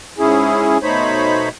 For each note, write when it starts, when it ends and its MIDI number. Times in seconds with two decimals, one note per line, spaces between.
0.18 0.78 44
0.18 0.78 61
0.18 0.78 64
0.18 0.78 68
0.83 1.49 47
0.83 1.49 57
0.83 1.49 63
0.83 1.49 72
0.83 1.49 73
0.83 1.49 83